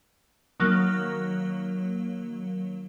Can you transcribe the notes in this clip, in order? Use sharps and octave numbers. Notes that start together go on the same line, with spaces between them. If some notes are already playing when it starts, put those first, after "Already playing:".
D#3 F#3 A#3